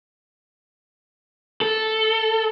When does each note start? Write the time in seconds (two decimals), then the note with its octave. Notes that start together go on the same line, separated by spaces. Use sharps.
1.61 A4